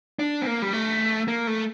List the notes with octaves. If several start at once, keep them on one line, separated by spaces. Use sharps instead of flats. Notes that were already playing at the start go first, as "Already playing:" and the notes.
D4
C4
A#3
G3
A3
A#3
A3